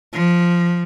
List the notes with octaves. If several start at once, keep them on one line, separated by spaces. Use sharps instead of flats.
F3